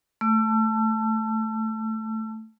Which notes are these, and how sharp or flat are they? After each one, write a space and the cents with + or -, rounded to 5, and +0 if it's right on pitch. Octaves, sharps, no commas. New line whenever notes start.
A3 +0 A5 +0 E6 +35